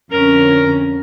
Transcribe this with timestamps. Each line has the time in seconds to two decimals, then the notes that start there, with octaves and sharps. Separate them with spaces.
0.12 F2 D3 C#4 A#4